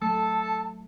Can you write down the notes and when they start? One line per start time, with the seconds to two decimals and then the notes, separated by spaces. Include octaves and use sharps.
0.01 F#3 A3 A4 A5